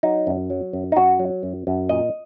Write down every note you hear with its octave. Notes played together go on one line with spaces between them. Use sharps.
F#3 D#4
F#2
F#3
F#2
D#4
F#2 F#4
F#3
F#2
F#2
A#2 D#5